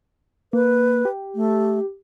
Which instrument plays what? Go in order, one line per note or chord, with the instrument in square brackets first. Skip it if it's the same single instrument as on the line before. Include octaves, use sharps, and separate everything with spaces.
[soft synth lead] A#3 [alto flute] B4
[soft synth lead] G4
[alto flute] A3